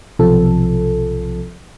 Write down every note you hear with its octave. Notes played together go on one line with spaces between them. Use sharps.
B1 C3 F3 A4